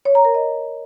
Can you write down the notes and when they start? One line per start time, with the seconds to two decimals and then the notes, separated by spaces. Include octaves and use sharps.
0.05 C#5
0.15 A#5
0.25 A#4
0.35 D#5